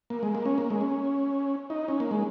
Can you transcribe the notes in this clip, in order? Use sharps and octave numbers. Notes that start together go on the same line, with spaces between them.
A#3
G#3
A#3
C#4
A#3
G#3
C#4
D#4
C#4
A#3
G#3